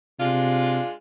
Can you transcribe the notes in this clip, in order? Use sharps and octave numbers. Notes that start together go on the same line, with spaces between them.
C3 G#3 D4 F4